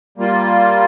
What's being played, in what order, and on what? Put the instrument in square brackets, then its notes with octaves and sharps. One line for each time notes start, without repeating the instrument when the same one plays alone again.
[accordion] G3 A#3 F4